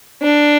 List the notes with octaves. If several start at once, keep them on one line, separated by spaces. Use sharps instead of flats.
D4